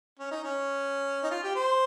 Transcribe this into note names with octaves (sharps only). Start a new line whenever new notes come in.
C#4
D#4
C#4
D#4
F4
G4
C5